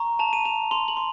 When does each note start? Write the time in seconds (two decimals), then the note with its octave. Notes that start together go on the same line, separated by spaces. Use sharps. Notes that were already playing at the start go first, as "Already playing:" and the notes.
Already playing: A#5 C#6
0.19 A5 F7
0.33 D#7
0.45 A5 F7
0.71 C6 F7
0.88 F#7
0.97 C6